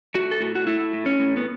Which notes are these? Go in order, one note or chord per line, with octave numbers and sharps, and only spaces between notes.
A3 F#4
A4
A2 F#4
F#4
A3 E4
A2
C#4
A2
B3